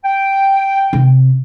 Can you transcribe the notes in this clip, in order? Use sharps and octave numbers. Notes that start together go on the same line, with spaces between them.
G5
C3